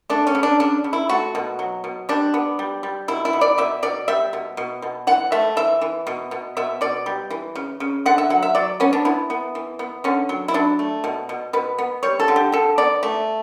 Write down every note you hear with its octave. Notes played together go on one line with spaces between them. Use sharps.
A3 D4
C#4
C#3
D4
C#3 D4
C#3
E4
A3 F#4
B2
F#3
B2
G3 D4
B3
G3
G3
B2 E4
E4
B2
D5
B2 E5
B2 D5
G3 E5
B2
B2
B2
E3 F#5
A3 E5
E3 E5
E3
B2
B2
B2 E5
B2 D5
G3
E3
C#3
C#3
D3 F#5
E5
F#3 F#5
E5
F#3 D5
B3 C#4
D4
B3 E4
B3
E3
B3
D3 C#4
F#3
E4
F#3 D4
A3
B2
B2
B2 B4
B3
G3 C#5
A4
D3
G4
D3 A4
B3 D5
A3 E5